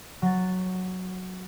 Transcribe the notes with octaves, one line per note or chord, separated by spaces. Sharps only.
F#3 A6